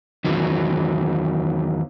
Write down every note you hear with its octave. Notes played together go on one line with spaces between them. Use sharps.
E2 D#3 F#3